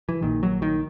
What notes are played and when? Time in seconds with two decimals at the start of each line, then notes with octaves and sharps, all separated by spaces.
0.09 E3
0.22 A#1 A#2 D#3
0.43 F#3
0.62 D#3